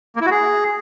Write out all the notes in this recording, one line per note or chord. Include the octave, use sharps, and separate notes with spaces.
A#3
E4
F#4
G#4